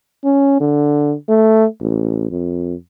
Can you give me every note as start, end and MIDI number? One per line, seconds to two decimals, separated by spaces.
0.25 0.59 61
0.61 1.14 50
1.29 1.65 57
1.81 2.27 33
2.31 2.75 41